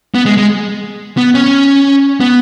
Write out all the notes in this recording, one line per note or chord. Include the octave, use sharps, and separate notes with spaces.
B3
G#3
G#3
B3
C#4
B3